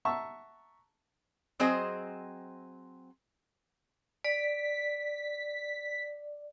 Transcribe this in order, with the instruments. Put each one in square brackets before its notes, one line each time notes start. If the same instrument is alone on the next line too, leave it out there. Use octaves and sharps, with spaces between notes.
[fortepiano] E5 F#5 A5 A#5 C#6 E6
[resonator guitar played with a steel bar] F#3 C4 G#4 C5 D#5
[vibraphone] D5 [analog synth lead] B6